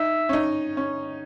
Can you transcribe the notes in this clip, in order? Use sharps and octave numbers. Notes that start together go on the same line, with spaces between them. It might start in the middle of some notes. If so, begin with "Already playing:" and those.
Already playing: D#4 E5
C#4
D#4
C#4